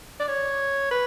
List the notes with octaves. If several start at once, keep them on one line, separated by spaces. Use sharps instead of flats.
D5
C#5
B4